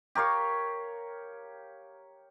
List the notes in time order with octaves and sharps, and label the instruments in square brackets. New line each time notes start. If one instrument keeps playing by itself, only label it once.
[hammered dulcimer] G4 A#4 C#5 F5